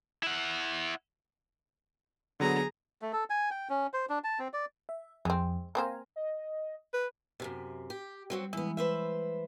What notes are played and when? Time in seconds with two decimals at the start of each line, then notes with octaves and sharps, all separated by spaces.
0.23 E4 F#5
2.40 D3 F#3 B3 G#4 A#5
3.02 A3
3.13 A4
3.30 G#5
3.51 G5
3.69 C#4
3.93 C5
4.09 D4
4.24 A5
4.39 C4
4.53 D5
4.89 E5
5.25 F2 G#3 C4
5.75 A#3 C4 C5 F5 G#5 A#5
6.16 D#5
6.94 B4
7.40 F#2 A2 C3
7.90 G4
8.30 F#3 G3 C4 F#4
8.53 E2 E3 G#3 B3 E4
8.77 B4 C5 E5